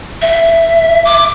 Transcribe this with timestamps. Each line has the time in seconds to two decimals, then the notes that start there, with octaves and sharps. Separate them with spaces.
0.21 E5
1.05 D6